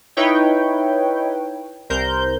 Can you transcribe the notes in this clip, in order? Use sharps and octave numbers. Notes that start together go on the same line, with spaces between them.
D#4 E4 B4 C#5 G5
C2 A#4 C5 G6